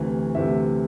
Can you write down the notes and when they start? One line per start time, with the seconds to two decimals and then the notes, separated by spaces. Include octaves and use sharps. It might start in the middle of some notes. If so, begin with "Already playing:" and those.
Already playing: D2 C3 E3 A3
0.35 D2 C3 E3 A3 E5